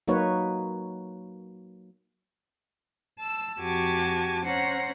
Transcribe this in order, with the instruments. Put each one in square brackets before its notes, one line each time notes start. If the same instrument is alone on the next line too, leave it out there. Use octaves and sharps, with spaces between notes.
[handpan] F#3 A#3 D#4 F#4 B4 C#5
[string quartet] A5 E6
F2 F#4 G4 G#5 A5 D6
C#4 C5 F#5 A#5